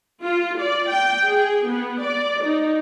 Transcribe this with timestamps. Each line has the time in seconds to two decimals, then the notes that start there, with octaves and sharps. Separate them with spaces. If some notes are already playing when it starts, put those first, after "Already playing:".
0.22 F4
0.61 D5
0.91 G5
1.28 G#4
1.69 B3
2.02 D5
2.45 D#4